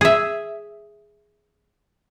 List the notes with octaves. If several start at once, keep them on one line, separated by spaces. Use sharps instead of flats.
G#4 E5